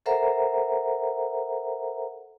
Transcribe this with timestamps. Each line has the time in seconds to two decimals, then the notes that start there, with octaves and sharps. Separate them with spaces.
0.06 A4 A#4 C5 E5 F#5 A#5